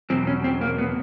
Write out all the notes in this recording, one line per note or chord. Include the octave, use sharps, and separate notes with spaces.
E2 B2 F#3 C4
C#4
C4
A#3
B3